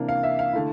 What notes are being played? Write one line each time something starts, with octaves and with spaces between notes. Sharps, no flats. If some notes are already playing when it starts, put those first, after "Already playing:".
Already playing: C3 E3 A#3 D4
F5
E5
F5
D3 A3 E4